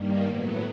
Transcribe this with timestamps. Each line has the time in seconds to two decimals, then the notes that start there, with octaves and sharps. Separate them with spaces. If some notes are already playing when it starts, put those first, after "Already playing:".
Already playing: G2 D#3 G3 A#3
0.26 A2 F#3 B3